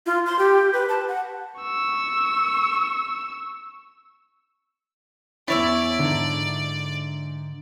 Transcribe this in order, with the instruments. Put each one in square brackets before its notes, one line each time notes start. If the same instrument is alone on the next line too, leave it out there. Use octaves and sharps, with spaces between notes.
[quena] F4
C6
G4
B4
A5
F#5
[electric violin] C#6 E6
[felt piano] E2 E3 A6 [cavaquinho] E4 C#5 E5 [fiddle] D5
[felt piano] G#2 A#5 [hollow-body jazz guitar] D3